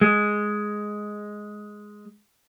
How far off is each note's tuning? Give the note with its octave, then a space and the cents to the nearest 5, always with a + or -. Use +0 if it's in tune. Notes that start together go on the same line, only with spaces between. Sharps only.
G#3 +5